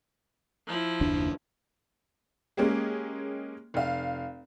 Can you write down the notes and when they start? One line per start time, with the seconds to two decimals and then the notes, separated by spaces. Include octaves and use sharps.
0.67 F3 E4
1.01 F#1 D#2 D4
2.57 G#3 A#3 C#4 G4 G#4
3.74 F1 F5